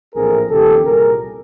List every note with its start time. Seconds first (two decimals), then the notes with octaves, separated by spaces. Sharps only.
0.15 A#1 A2 E3 A3 C4 G#4 A#4
0.50 D#2 C#3 F3 G4 A4
0.86 C2 A#2 G3 G#4 A#4